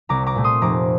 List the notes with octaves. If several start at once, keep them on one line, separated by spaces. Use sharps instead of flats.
C2 A#5 D6
A#5 D6
A#2 A3
C6 D#6
F1 A#5 D6